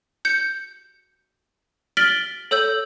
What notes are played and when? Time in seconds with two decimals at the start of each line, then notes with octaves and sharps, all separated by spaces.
0.25 G6 C#7
1.97 F6 A6 B6 D7 F#7 G7
2.51 A4 C#5 E6 G6 F#7